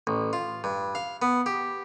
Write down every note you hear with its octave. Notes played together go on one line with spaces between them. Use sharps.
A1
F4
G2
F5
B3
G4